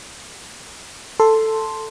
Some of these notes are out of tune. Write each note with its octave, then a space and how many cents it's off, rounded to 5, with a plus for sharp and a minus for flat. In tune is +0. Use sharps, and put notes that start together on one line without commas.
A4 +5 C6 +0